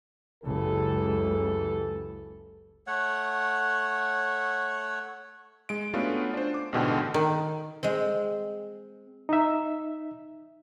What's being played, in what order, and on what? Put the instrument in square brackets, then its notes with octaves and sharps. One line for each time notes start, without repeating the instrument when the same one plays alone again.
[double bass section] F#1 C#2 C#3 [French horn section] E3 G4 A4
[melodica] A3 C#5 F#5
[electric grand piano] G#3 D7
A3 B3 C#4 D4 F4 F#4
D4 C5
D6
A1 G#2 B2 D3 G5
[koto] D#3
[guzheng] G#3 C4
[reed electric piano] D#4 E5